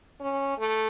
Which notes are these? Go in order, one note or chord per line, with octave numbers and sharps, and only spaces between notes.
C#4
A3